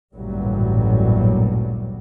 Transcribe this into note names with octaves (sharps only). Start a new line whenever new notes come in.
A1 D2 G2 A#2 F#3 G3